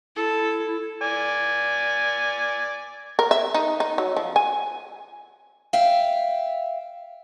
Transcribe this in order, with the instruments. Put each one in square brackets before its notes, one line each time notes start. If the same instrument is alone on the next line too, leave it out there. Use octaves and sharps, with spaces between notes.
[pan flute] E4 [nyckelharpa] A4
[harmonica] D5 G#5
[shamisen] A#4
E5
D#4
D#4
F#3
F3
G#5
[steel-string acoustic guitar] E5 F5 G5